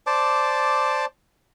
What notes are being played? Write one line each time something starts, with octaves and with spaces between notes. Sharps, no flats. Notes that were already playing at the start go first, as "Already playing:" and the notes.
C5 D5 A5 D6